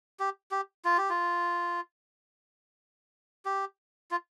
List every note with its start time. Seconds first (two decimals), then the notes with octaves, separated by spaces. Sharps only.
0.20 G4
0.51 G4
0.85 F4
0.98 G4
1.10 F4
3.45 G4
4.11 F4